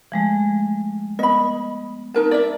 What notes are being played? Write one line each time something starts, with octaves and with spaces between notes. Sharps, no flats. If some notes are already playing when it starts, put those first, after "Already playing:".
F3 G#3 A3
B3 D#5 B5
D#4 A#4 A5
D5 E5